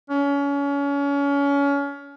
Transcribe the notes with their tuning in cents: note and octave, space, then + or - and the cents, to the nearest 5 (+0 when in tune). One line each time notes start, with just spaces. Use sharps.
C#4 +30